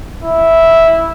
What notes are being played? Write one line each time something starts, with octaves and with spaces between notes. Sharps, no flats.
E4